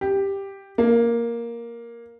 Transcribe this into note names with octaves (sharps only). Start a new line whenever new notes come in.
G4
A#3